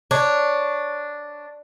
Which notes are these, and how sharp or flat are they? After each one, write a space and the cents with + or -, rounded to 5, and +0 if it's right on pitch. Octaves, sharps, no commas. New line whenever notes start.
D4 +0 C#5 +0